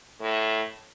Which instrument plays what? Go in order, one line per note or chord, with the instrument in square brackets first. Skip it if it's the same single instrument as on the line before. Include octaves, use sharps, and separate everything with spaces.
[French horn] A2